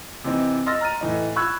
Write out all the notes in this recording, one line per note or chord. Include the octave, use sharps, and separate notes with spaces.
C3 E3 C4 D#4
D#5 C6 E6 F6 A6 A#6
A#5 F6 A6 D#7
A2 E3 D#4
B5 C#6 E6 F#6 G#6